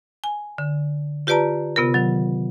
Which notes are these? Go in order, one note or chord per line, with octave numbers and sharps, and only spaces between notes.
G#5
D3
F4 G4 B4 D5 A5 A#5
C3 B3 F4 A#4
D#3 F#3